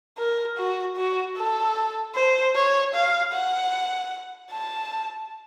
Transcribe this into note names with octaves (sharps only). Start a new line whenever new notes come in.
A#4
F#4
F#4
A4
C5
C#5
F5
F#5
A5